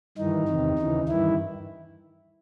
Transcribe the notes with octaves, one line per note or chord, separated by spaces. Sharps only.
G2 D#3 E3 D#4
E2 C3 D#3
D#2 C#3 E3
G2 D#3 E3 E4